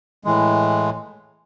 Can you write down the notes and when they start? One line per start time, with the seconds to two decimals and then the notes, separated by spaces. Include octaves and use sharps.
0.24 A2 E3 G#3